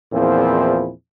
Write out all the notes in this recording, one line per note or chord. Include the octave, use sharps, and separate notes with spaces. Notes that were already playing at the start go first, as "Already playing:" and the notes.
E2 A#2 F3 C4 E4 G#4